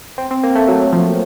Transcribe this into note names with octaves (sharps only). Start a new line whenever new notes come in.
C4
C4
A#3
A3
F#3
F3